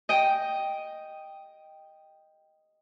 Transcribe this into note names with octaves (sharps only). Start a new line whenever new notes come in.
D#5 G5